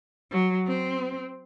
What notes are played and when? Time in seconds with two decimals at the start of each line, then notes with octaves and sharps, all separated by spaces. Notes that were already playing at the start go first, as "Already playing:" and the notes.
0.31 F#3
0.68 C4